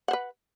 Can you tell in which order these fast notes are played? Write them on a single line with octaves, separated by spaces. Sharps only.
F#5 C5 B4